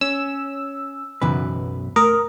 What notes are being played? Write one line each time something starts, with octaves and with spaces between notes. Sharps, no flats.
C#4 E6
B1 F#2 C#3 E3 B3 B4
A3 A#4 D#6